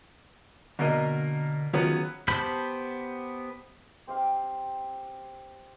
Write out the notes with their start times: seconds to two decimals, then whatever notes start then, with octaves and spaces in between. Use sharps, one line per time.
0.79 B2 D3 A#3 A#4 D#5
1.73 D#3 F#3 B3 C#4 F4 G#4
2.28 B3 G4 C5 A5 B5
4.07 C4 G4 F5